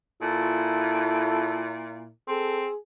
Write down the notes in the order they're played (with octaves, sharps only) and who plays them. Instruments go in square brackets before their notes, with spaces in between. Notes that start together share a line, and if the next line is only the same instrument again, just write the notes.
[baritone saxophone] A#2 [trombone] E4 [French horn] F4 [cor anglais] A4
[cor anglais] C4 [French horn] G#4 [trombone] A4